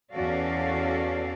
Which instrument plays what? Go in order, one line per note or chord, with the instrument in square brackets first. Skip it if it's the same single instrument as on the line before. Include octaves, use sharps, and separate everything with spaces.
[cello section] E2 C#4 F#4 A4 D5 F5